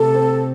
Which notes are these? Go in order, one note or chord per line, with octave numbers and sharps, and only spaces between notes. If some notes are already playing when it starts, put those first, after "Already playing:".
Already playing: C3 A3 A4
C4